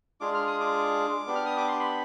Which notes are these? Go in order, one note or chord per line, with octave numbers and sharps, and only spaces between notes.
G#3 D4 F4 G#4 D6
F6
D#6
D6
B3 D4 G4
F6
D#6
D6
C6
B5